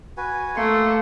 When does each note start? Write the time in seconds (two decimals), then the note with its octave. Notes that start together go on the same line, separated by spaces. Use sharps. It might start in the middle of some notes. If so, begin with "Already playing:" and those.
0.17 F#4 B4 G#5
0.56 A3 A#3 C6 C#6